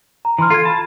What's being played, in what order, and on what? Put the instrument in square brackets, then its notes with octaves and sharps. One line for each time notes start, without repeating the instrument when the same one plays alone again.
[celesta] A#5
[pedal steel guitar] E3 [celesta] A#5 C6 F6
[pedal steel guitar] F4 [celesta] A4 G#6
[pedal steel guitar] A5 [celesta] B5